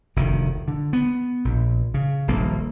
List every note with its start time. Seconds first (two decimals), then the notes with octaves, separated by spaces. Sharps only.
0.16 F1 D2 D#3
0.68 D3
0.93 B3
1.45 A#1
1.94 C#3
2.28 D#1 A#1 G2 A#3